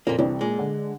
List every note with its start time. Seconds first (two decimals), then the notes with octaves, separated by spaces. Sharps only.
0.07 F2 A#2 A#3
0.19 C2 E3 C4 D4
0.41 A#2 G#3
0.59 D3